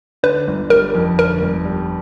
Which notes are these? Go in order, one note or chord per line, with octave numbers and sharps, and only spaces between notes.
D3 B4
G1
G3 A#4
F2
D3 A#4
G1
G3